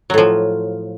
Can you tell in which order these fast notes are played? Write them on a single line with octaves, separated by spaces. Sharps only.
F#3 A2 F3